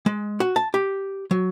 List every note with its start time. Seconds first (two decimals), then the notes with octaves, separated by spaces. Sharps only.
0.06 G#3
0.40 F#4
0.56 A5
0.74 G4
1.31 F#3